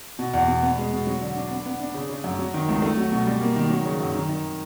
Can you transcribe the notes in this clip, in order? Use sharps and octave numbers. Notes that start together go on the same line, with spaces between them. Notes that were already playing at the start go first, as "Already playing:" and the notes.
B2
E2
B2
B3
G#3
B2
F#3
D3
D4
B3
B3
D4
C#3
C#3
F#2
F#3
D#3
C#2
A3
F#3
B2
G3
A#3
D#3
F#3
C#3
F#2
D#3
D#3